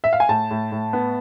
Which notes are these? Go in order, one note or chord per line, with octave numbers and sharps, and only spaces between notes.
E5
F5
G#5
A2 A5
A2
A2
B3